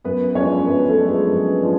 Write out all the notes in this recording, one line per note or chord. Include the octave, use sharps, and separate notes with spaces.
F#2 B3 B4
B4
F3 G#3 C#4 D4 C#5
F#2 B3 B4
A3 A4
F3 G#3 D4
G#3 G#4
F#2
F3 G#3 D4